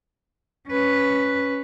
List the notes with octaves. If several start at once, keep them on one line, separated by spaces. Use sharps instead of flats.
C#4 B4